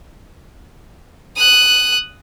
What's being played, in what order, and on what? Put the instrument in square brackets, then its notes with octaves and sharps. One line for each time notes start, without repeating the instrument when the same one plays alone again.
[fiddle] D#6 F#6